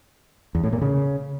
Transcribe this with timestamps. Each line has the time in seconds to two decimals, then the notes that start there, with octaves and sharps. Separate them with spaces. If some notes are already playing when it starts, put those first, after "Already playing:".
0.55 E2
0.64 A2
0.73 A#2
0.82 C#3